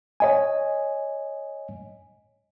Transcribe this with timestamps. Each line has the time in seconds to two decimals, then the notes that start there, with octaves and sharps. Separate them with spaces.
0.20 C#5 D#5 G#5